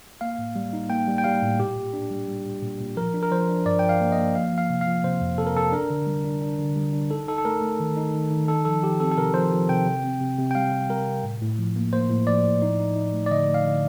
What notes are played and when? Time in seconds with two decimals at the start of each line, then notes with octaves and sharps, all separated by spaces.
0.21 A#3 F5
0.39 A2
0.56 G3
0.73 D#4
0.90 A#3 G5
1.08 G3
1.18 G5
1.24 G3 F5
1.42 A2
1.60 A#2 G4
1.76 A#2
1.93 D4
2.11 G3
2.28 G3
2.46 A#2
2.62 A#2
2.80 A#2
2.96 F3 A#4
3.14 D4
3.22 A#4
3.31 F3 C5
3.49 D4
3.65 G2 D5
3.79 F3 G5
3.89 F5
4.01 A#3
4.12 D#5
4.18 A#3
4.35 F3 F5
4.53 F3
4.58 F5
4.70 C3
4.81 F5
4.87 F3
5.04 C3 C5
5.21 F2
5.38 C3 A4
5.46 A#4
5.56 C3 A4
5.72 D4 A#4
5.90 D3
6.07 G3
6.24 D4
6.42 D4
6.59 D3
6.76 G3
6.93 D4
7.10 D#4 A4
7.28 D#4 A4
7.38 A4
7.45 A3 A#4
7.62 A3
7.80 D#3
7.97 D#4
8.14 D#3
8.31 D#3
8.48 D#4 A4
8.65 F3 A4
8.82 F3 G4
9.00 C4 A4
9.12 A4
9.17 C3 A#4
9.34 F3 C5
9.52 F3
9.69 C3 G5
9.86 C3
10.04 C4
10.21 C3
10.38 C3
10.51 G5
10.55 G3 F5
10.72 C3
10.89 G3 A#4
11.07 C3
11.24 A2
11.42 A2
11.59 F3
11.76 A#3
11.93 A#3 C5
12.10 A2
12.27 F3 D5
12.44 A2
12.62 D#4
12.80 D#4
12.96 D#4
13.13 A3
13.26 D5
13.31 D3 D#5
13.48 A3
13.54 F5
13.65 D3